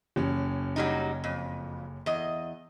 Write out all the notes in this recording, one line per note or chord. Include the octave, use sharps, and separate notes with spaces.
F#1 C#4
F#3 G3 D#4
F2
E2 D#5